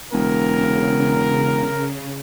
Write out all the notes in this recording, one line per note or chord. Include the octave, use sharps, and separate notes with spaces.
E1 C#3 A#4